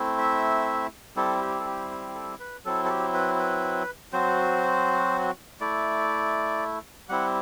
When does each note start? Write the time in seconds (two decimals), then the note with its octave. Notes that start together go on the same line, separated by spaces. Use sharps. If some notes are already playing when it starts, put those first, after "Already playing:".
Already playing: A3 C4 E4
0.18 E5
1.16 G3 C4 E4 A4
1.41 G4
1.59 A4
1.66 G4
1.91 G4
2.15 A4
2.40 B4
2.65 F#3 C4 E4 A4
2.85 A4
2.89 G4
3.14 B4
3.39 B4
4.12 F#3 C4 F#4 C5
5.61 A3 E4 D5
7.09 G3 C4 E4 F#5